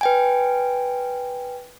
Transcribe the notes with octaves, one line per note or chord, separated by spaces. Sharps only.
B4 G5 G#5